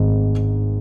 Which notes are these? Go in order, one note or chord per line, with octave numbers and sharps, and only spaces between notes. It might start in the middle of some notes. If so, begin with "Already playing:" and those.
Already playing: G#1 G#2